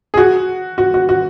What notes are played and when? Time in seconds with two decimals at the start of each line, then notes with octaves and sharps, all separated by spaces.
0.14 G#4
0.17 F#4
0.78 F#4
0.94 F#4
1.09 F#4